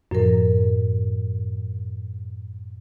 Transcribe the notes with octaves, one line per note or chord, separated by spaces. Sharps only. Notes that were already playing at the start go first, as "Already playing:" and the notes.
F#2 A2 F3 A#4